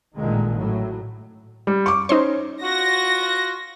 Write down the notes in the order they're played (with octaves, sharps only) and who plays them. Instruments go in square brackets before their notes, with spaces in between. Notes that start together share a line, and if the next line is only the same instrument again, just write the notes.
[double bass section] A1 A#2 D3 D#3 G#3
A2 F#3
[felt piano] G3
C#6 D6
[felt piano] C#4 [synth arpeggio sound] D#4 C5 C6
[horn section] F4 F#4 [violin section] A#6